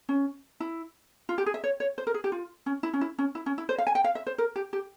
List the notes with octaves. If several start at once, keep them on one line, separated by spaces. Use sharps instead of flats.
C#4
E4
F4
G4
G#4
E5
C#5
C#5
C5
A#4
G#4
G4
F4
C#4
E4
C#4
E4
C#4
E4
C#4
E4
C5
F5
G#5
G5
F5
E5
C5
A#4
G4
G4